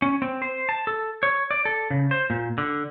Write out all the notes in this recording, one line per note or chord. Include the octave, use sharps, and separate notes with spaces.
C#4
C4
C5
A5
A4
C#5
D5
A4
C#3
C5
A#2
D3